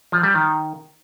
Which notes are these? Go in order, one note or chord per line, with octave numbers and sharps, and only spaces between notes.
F3
G3
D#3